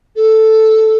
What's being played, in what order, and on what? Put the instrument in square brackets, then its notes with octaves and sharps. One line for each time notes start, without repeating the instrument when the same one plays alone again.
[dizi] A4